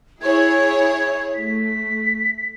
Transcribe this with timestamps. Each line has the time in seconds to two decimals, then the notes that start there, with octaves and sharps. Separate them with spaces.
0.21 E4 G#4 C#5 G#6
1.35 A3 B6